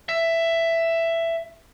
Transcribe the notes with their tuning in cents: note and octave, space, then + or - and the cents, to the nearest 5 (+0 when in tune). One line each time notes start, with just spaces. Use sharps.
E5 +10